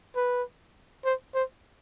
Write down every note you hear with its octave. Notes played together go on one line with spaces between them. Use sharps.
B4
C5
C5